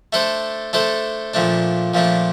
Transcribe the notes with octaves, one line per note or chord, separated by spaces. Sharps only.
A3 D4 A4 C5
A3 D4 A4 C5
A#2 F3 A3 D4
A#2 F3 A3 D4